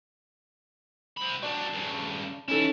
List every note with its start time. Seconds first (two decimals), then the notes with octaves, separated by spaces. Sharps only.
1.17 C4 B5
1.43 F#3 D4 D5 A5
1.73 G2 C#3
2.48 E3 C#4 D#4 E4 A4